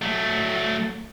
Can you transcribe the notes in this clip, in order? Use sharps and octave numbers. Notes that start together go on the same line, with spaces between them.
F#3 A3